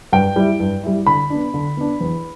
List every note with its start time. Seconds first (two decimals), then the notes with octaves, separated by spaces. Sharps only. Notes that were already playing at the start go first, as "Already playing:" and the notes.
0.13 G2 G5
0.36 G3 E4
0.60 G2
0.84 G3 E4
1.06 D3 B5
1.30 B3 D4
1.54 D3
1.77 B3 D4
2.01 E2